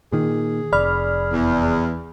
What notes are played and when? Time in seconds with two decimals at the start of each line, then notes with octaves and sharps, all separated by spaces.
0.12 A#2 D#3 G#4
0.73 F1 D5 B5 F6
1.32 E2